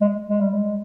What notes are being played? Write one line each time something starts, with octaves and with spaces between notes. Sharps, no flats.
G#3
G#3
G3
G#3